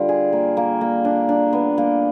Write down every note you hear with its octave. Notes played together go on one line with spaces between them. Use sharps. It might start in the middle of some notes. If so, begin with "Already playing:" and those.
Already playing: D3 G3 F4
G#4
A#3
A#3
A#3
D4
D4
B3
A#3